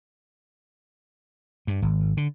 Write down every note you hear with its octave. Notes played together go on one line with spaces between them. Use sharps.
G2
G#1
D3